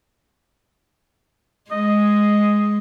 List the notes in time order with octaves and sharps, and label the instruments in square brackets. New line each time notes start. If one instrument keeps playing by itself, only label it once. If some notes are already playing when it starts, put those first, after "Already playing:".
[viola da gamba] G#3 [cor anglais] D#5